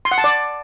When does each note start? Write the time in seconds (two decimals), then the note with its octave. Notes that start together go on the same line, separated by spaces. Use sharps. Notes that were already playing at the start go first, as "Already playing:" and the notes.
0.05 C6
0.11 F#5
0.18 A5
0.24 D5